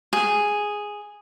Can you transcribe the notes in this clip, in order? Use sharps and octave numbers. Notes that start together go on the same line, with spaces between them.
G#4